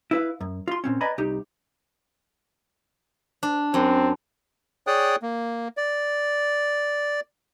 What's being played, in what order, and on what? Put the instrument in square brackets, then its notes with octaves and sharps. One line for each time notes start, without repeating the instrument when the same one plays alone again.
[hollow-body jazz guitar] E4 B4 F5
F#2
F4 C6
A#2 C4 C#4
B4 D5 D#5 G#5 A#5 B5
C2 D#4 G4
[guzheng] D4
[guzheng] F#2 [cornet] C4
[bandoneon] G#4 C#5 D5 G5 D#6 F#6
A#3
D5